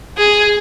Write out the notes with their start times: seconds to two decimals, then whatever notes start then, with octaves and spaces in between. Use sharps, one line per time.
0.18 G#4